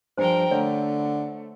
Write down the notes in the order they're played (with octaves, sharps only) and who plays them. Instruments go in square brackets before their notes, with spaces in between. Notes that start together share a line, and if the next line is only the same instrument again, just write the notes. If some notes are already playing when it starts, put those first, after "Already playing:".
[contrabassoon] G2 [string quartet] F3 A#4 G5 [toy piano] C5 G#5
[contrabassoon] D3 [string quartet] A3 [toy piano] C#5